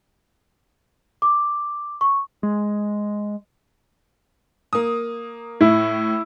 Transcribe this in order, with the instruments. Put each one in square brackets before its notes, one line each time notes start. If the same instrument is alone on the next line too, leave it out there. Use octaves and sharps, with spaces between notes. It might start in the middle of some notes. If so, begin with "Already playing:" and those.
[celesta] D6
C#6
[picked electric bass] G#3
[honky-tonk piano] A#3 D#6
[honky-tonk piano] A2 [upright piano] E4